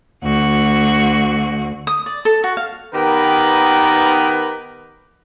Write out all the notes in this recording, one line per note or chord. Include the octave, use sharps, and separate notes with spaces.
D2 F#4
D#6
D5
A4
F#4
F5
D#3 B3 G4 A#4 B4